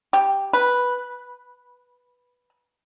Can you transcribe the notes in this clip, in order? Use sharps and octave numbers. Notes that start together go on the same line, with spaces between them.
G4
B4